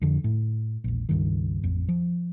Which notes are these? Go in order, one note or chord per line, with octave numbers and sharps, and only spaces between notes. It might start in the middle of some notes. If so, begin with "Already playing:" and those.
F2 D3
A2
E1 A#1
C#2 G2 D#3
A1 F2
F3